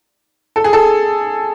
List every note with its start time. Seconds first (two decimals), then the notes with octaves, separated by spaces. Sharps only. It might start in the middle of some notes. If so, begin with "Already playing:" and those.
0.56 A4
0.64 G#4
0.73 A4